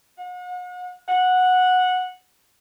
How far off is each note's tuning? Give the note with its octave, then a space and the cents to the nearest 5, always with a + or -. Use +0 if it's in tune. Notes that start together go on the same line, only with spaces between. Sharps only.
F#5 -40
F#5 -10